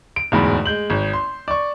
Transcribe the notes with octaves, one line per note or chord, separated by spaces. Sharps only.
D7
D1 E2 G#2 B5
G#3 G6 F#7
G#1
C6
D5 C#6